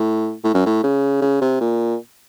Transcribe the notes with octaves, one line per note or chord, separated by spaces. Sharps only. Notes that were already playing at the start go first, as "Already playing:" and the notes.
Already playing: A2
A2
F#2
A2
C#3
C#3
C3
A#2